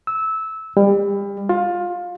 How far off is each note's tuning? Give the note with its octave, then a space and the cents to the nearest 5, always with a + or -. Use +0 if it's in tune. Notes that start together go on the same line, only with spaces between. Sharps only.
E6 -15
G3 +30
F4 +20